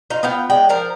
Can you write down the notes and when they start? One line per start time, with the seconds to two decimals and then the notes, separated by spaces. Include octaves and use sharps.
0.10 D#4 F4
0.23 B3 F4 G5
0.50 G#3 D5 G5
0.69 F3 A#4 C5